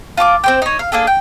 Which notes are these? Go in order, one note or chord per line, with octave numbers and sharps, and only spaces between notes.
F4 A5 C#6 D6
C4 C5 G5
D#4 C#5
F5
A#3 D4 G#4 A4
G5